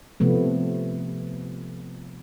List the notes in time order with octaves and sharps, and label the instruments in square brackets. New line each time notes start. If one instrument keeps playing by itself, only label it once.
[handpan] C3 F3 A3 B3